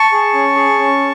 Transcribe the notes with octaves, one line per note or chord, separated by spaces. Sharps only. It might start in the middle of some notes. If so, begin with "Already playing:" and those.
Already playing: A5 C#6
G#4
C#4
G#4
C#4